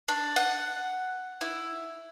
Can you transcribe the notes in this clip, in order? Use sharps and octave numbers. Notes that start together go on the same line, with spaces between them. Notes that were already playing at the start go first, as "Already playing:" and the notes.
D4
F#5
E4